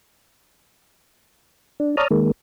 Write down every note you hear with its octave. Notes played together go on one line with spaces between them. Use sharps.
D4
C#5 D5 A5 A#5 D#6 F6
D#3 G#3 A#3